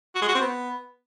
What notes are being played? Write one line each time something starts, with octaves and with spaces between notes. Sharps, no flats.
F#4
G#3
F#4
C4
B3